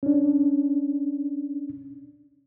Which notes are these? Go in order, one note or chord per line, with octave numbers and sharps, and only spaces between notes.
C#4 D4